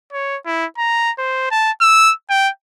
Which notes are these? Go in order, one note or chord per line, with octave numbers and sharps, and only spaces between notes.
C#5
E4
A#5
C5
A5
E6
G5